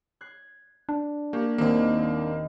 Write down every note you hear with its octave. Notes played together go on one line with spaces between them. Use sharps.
F#6 G#6 C7
D4
A#3 G4 C#6
D#1 D#2 A#3 C4